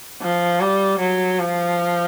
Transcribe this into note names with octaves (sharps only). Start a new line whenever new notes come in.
F3
G3
F#3
F3